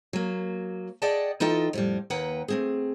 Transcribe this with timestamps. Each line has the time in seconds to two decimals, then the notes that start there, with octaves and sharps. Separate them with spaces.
0.13 F#3 A#3
1.02 G#4 D5 D#5 F#5 G5 A5
1.40 E3 D#4 F4 A4 D#5 G5
1.73 F2 A2 G3
2.10 D#2 A#3 B4 F#5 G5
2.48 A3 C4 G#4